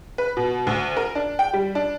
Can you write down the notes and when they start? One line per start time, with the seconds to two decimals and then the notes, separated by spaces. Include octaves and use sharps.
0.18 B4
0.37 B2
0.67 D2
0.97 A#4
1.15 D4
1.39 G5
1.53 G3
1.75 D4